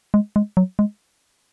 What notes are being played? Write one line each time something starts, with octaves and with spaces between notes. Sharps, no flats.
G#3
G#3
F#3
G#3